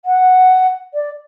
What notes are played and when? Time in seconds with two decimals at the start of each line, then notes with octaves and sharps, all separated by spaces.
0.05 F#5
0.94 D5